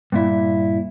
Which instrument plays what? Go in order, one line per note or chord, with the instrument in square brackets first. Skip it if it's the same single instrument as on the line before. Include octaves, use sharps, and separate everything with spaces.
[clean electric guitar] G2 A#2 E4